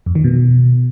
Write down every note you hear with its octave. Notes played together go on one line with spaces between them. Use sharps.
F2
D#3
B2